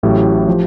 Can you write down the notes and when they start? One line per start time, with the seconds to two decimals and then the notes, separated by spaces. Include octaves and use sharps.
0.03 A1 A2 F#3 A3 G4
0.49 F3